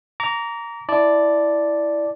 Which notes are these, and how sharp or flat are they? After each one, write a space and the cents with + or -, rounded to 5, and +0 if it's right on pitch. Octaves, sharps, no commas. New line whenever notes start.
A#5 +0 D6 -40
E4 +0 D5 +0 A5 +0